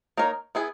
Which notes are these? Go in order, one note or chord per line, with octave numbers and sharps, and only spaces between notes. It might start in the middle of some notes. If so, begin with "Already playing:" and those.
A#3 D#4 A#4 C#5
B3 E4 G#4